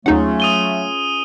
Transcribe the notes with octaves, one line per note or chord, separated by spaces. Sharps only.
D#2 F#3 A3 C#4 D#4 F4 G#4 F#5
D#6 D#7 G7